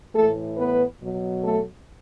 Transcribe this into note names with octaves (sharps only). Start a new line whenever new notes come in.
A2 E3 A3 A4
B3 B4
B2 F#3
A3 A4